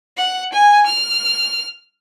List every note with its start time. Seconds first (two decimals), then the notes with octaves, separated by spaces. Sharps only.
0.17 F#5
0.53 G#5
0.86 F6